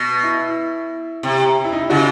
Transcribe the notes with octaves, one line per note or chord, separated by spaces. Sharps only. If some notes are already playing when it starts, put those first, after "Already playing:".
Already playing: B2
E4
C3
E4
D#4
E4
C#3 F#4